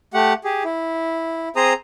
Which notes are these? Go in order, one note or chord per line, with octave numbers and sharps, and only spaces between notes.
A3 G4 F#5
G4 G#4
E4
C4 G#4 C5 A#5 D#6